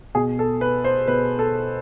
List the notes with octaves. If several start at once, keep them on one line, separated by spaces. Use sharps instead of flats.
B2 G#4
A4
B4
C5
B2 B4
A4